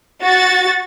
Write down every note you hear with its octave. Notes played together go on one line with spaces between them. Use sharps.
F#4 A6